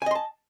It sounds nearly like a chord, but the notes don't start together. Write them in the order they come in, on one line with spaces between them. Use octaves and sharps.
G#5 D#5 C6 A5